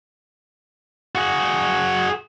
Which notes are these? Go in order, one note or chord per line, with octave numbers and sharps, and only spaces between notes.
F#4 G#4